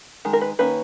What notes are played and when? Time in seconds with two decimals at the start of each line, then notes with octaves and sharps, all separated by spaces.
0.25 D#3 G#3
0.33 A#4
0.41 B4
0.59 D#3 A#3 C#4 B4